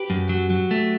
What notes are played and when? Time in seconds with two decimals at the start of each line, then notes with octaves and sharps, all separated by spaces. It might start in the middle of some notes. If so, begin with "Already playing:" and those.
Already playing: G4 B4
0.10 F#2
0.29 F#3
0.50 F#3
0.71 A3